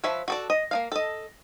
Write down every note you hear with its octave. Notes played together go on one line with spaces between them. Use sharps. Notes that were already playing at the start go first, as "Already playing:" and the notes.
F3 B4 C#5 E5
F#4 A4 D5
D#5
A#3 D#4 F5
A4 D#5